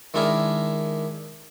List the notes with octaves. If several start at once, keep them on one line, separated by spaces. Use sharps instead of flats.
D#3 G#3 D4 E4 G#4 A#4